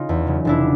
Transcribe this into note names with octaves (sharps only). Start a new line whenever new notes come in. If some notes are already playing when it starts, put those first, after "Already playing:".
Already playing: C#3 D#4 F4
E2
C#3 F#3
F1 D4 E4